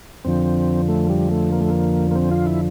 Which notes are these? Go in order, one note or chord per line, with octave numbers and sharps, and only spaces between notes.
F2 D3 F3 C4
A3
G3
A3
A#3
A3
A#3
A#3
C4
F4
E4